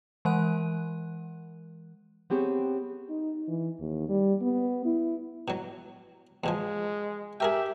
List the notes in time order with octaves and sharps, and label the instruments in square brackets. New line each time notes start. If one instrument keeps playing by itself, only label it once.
[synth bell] E3 G#3 A#4 F#5 F#6 D#7
[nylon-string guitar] B3 C4 G4 G#4 C#5
[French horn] D#4
E3
D#2
G3
B3
E4
[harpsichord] B2 F#3
[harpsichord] E2 B2 F3 [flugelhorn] G#3
[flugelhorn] G4 [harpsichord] G#4 A#4 G5 [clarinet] E5